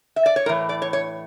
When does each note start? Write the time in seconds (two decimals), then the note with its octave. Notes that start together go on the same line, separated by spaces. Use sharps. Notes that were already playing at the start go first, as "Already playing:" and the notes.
0.16 E5
0.26 D5
0.36 C#5
0.46 A2 A#4
0.49 E3
0.69 D5
0.82 C#5
0.93 C#5